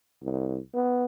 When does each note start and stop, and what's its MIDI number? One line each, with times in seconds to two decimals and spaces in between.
0.23 0.58 36
0.74 1.05 59